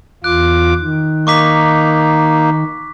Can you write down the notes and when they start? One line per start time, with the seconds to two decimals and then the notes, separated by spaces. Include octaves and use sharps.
0.24 E2 F4 D6 F#6
0.81 D#3
1.27 A#3 D#4 C#6 D6 B6